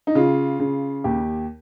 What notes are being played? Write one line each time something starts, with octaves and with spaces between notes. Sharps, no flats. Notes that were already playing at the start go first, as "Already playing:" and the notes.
D#4
C#3 F4
C#3
D#2 G4